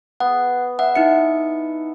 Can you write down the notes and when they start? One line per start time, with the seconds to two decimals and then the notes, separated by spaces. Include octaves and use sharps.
0.20 B3 F#5
0.79 E5 F#5
0.95 D#4 E4 C#7